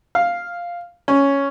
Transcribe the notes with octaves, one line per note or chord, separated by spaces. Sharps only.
F5
C#4